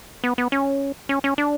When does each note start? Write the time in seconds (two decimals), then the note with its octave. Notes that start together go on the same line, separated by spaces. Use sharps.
0.24 B3
0.38 B3
0.52 C#4
1.09 C#4
1.24 C#4
1.38 D4